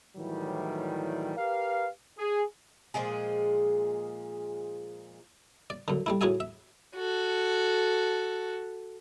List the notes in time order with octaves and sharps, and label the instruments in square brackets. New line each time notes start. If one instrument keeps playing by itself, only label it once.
[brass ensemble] A2 D#3 E3 F#3 G3
G4 A#4 B4 F5
G#4
[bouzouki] A#2 F3 G#3 G#4
[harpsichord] D5
F#2 D3
G3 A3 E4
A2 C#4 F#4 G#4 E5 G#5
E5
[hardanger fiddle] F#4 A4